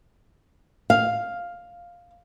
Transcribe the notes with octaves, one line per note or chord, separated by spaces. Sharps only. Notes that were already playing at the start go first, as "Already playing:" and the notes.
F5